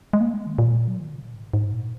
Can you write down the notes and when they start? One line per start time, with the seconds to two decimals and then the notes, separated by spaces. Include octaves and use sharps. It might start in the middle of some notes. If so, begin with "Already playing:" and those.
0.13 G#3
0.21 A#3
0.34 G#3
0.46 D#3
0.58 A#2
0.88 F#3
0.99 D#3
1.12 C#3
1.22 A#2
1.35 G#2
1.54 G#2
1.72 A#2